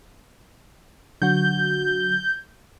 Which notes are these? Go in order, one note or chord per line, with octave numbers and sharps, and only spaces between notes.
D3 F#3 F#4 G6